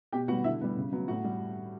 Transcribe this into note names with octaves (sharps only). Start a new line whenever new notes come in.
B2 G4 G5
G3 B3 F#4 F#5
D3 E4 E5
G3 B3
C#3
F#3 B3
A2 F#4 F#5
G3